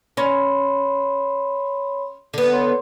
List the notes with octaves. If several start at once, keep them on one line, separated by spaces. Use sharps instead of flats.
C#4 C#5 B5 C6
D3 B3
C#5 C6